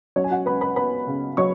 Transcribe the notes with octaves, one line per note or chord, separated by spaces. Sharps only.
F#3 C#4 C#5
G#5
F#4 F#5
C#2 B4 B5
B4 B5
B3 B4 B5
C#3
F#3 C#5 C#6